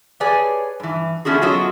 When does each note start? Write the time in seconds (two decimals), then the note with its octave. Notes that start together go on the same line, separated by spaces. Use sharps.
0.20 G4 G#4 B4 C#5 D5 G#5
0.80 G2 E3
1.25 A3 B3 C#4 D4 F#4 G#4
1.42 F#3 B3 F4 F#4 A4 D#5